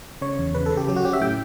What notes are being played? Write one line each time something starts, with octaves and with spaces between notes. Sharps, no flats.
C#3 C#5
E2
C#3 B4
A4
C#3
G4
F#3 G4
F#4
C#4 G4
E5
A2 G5